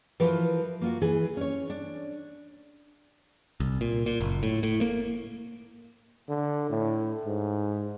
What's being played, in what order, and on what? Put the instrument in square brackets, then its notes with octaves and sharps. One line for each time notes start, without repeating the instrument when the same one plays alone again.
[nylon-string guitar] E3 F3 F#4 A#4 B4
A#3 F4 F#4
E3 G#4
C#4 C#5
D4
[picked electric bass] C2
A#2
A#2
F#1
A2
A2
A#3
[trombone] D3
A2
G#2